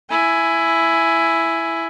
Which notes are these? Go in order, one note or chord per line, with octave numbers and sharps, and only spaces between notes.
E4 G#5